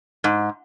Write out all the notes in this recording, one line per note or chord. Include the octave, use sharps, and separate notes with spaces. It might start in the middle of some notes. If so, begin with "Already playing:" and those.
G#2